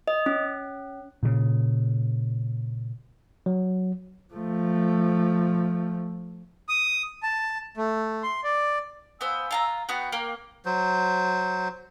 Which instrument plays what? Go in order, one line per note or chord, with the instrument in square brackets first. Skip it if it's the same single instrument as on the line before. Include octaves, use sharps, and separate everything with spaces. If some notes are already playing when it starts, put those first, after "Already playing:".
[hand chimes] D#5
C#4
[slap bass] A#2 C#3
[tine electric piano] F#3
[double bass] F3 A3
[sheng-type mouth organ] D#6
A5
A3
C6
D5
[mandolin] B3 C5 [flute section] F5 G#5 E6
[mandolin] F4 A5 A#5
[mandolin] B3 F#4 [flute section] G5
[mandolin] A#3
[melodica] F#3 C5